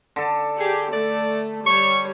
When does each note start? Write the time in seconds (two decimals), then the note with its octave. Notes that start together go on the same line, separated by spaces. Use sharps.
0.16 D3 A4
0.60 G4 G#4
0.93 A3 D5
1.66 G3 C#5 C#6